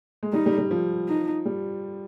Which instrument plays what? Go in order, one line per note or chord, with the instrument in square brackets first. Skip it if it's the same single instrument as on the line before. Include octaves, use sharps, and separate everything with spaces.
[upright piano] G#3
[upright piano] G3 [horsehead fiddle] D#4
[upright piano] G3
G3
F3
[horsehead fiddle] D#4
[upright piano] G3